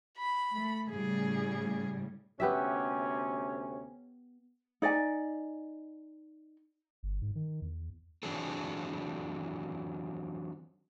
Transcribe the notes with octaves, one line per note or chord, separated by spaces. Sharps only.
B5
A3
A2 C#3 G3 G#4
D2 C3 B3 C#4 G4 E5
D#4 D5 D#5 G#5
G1
G#2
D#3
E2
E3 F#3 C4 D4 G#4 A4